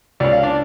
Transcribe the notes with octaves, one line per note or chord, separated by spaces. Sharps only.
C#2 D5
F5
D4 D5